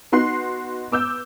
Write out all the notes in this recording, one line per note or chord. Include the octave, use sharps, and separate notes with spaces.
B3 D#4 F#4 C6 F#6 C7
B3 D6 E6 G6